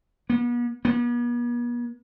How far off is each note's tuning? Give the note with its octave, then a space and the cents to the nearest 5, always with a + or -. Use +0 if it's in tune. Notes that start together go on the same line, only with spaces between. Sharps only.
B3 -40
B3 -45